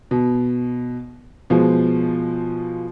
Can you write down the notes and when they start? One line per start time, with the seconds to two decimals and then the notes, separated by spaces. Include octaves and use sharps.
0.11 B2
1.50 B2 F3 G#3